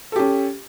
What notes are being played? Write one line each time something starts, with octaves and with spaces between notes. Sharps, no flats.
C#4 G4 A4